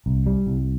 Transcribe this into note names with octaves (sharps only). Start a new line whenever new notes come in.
C2
G3
C2